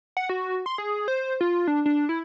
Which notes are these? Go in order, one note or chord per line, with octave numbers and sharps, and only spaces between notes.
F#5
F#4
C6
G#4
C5
F4
D4
D4
E4